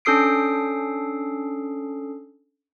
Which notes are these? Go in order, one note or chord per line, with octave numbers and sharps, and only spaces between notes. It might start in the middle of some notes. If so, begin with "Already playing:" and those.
C#4 D4 A4 D#6 C7 D7